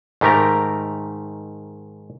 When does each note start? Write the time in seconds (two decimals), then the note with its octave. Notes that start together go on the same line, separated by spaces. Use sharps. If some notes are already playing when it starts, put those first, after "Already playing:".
0.21 G#2 D#3 A3 G4 A#4 A#5